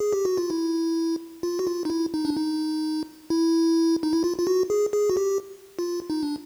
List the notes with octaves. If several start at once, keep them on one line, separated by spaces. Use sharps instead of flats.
G#4
G4
F#4
F4
E4
F4
F#4
F4
D#4
E4
D#4
D4
D#4
E4
D#4
E4
F4
F4
F#4
G#4
G#4
F#4
G4
F4
D#4
D4